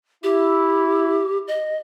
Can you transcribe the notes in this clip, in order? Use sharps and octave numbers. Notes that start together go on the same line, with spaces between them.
E4 G4
D#5